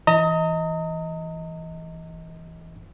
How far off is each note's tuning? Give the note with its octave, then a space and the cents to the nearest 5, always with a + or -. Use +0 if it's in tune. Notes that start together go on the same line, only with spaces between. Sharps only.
E3 +0 D#5 +20 A#5 -35